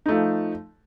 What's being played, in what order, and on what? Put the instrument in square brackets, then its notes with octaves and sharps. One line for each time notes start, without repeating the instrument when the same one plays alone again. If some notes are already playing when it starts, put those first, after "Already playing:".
[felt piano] D#4
A3
F3